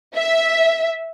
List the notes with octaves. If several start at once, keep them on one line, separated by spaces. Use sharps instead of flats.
E5